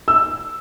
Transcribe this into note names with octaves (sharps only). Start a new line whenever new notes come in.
E6